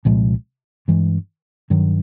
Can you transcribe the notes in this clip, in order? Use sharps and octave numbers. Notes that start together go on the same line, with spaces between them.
C2 A#2 F3 G#3
G2 E3 G#3
G2 D#3 F#3